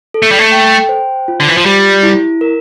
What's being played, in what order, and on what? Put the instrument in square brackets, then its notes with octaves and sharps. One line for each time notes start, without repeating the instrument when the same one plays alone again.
[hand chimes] A4
[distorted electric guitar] A3
G3
A3
[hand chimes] G5
C5
F4
[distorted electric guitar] D3
E3
F3
[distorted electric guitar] G3 [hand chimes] G4
[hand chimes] E4
A#4